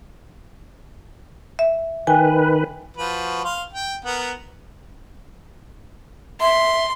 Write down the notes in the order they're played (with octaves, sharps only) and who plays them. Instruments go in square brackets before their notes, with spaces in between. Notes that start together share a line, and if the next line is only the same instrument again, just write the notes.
[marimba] E5
[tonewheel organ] D#3 B4 [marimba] G5 G#5
[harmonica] F3 F#4 B4
F5 C6
G5
B3 A#4 F#5
[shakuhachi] E5 [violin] C6